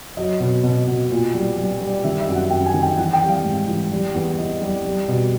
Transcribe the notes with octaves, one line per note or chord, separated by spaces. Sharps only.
F#3 D#5
B2
B2
B2
A#2
G3
G3
G3
D#3 E5
E5
F#2
F#5
F#2 G5
G#5
D#3
G5
E3 F#5
G5
G3
F5
G#2
E3
G3
E2
E3 D#5
G3
G3
B2